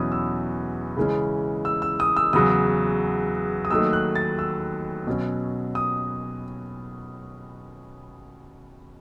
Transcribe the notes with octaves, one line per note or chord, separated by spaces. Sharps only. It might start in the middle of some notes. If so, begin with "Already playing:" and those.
Already playing: E2 B2 F#3 C#4 E4 D#6
E6
C#3 E3 G#3 C#4
E6
E6
D#6
E6
E2 C#3 F#3 D#6
D#6
D#2 D#3 F#3 A3 D#4 E6
F#6
A6
E6
B2 F#3 C#4
D#6